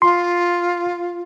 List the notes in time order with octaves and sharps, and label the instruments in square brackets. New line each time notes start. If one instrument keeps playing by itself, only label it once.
[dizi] F4 [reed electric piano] C6